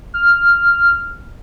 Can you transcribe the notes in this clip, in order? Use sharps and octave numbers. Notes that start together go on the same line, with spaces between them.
F6